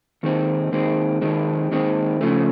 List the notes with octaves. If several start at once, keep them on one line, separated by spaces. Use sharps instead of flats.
D#2 D#3 G#3 C4
D#2 D#3 G#3 C4
D#2 D#3 G#3 C4
D#2 D#3 G#3 C4
C#3 F3 A3